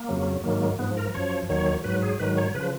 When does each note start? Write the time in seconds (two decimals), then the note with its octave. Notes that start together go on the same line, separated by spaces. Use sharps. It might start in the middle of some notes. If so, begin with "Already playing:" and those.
Already playing: A#3
0.09 F2 C#3 F#3
0.44 G#2 D#3 F#3 A#3
0.79 G#2 F3 B3
0.97 A#4
1.14 F#2 F3 C#5
1.49 D#2 D#3 F#3 C#5
1.84 G#2 F#3 B4
2.02 G#4
2.20 G#2 D#3 F#3 B4
2.37 C#5
2.55 C#3 F3 B4